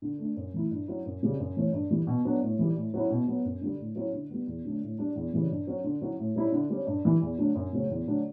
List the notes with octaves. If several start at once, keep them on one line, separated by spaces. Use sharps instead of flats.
D3
A3 D4
F#2
E3 A3 E4
G2
F#3 C#4 E4
F#2
C#3 G3
F#2
E3 A3 C#4
G2
E3 G3
B2
F#3 B3 D4
A2
E3 G3
A2
F#3 C#4 E4
B2
F#3 B3
F#2
D3 G3
A2
F#3 C#4 E4
D3
G3 B3
E2
D3 F#3 A3 D4
A2
G3 D4
E2
C#3 E3 G3 C#4
G2
F#3 C#4
D3
F#3 C#4 E4
A2
G3 C#4 E4
D3
G3 C#4
G2
E3 G3
E2
D3 F#3 A3 D4
F#2
C#3 F#3 A3 C#4
E2
D3 F#3 A3 D4